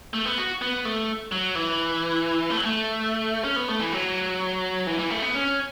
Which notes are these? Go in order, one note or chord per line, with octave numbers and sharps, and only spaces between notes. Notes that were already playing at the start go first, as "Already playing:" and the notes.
A3
B3
F#4
B3
A3
F#3
E3
A3
F#3
A3
C#4
B3
A3
E3
F#3
E3
E3
A3
B3
C#4